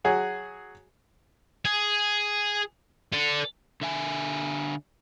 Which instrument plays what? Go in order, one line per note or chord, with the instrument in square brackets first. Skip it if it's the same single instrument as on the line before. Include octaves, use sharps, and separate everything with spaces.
[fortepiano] F#3 F#4 G#4
[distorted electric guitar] G#4
A4 D5
[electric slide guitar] D3 E5 G#5